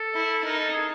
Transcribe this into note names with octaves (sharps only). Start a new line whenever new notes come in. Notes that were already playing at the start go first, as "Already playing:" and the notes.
Already playing: A4
E4
D#4 A#4
A4
G#4